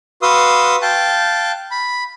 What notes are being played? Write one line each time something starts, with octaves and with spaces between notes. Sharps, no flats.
F#4 B4 F5 C6 D#6 E6
F5 G5 A5 F#6
B5